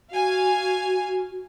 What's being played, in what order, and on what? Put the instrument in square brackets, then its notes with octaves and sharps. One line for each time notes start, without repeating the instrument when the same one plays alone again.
[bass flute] F#4 [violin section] F5 G#5